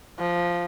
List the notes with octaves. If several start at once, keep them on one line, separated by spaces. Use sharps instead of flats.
F3